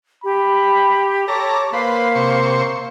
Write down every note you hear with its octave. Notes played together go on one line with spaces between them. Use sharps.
G4 B5
A4 C#5 A#5 D6
A#3 B4 C5 F5
C3 C5 C#6